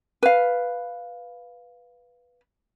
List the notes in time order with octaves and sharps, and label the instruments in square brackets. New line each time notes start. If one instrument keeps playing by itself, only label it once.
[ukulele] B4 F5